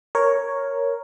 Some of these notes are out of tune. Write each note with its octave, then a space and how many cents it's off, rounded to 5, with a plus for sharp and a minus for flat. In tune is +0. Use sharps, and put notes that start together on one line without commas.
A#4 +0 C#5 +0